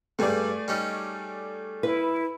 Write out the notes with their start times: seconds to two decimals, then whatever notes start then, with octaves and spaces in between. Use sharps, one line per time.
0.19 G2 G3 A3 G#4 D5
0.68 G3 C#4 D#4
1.83 E4 B4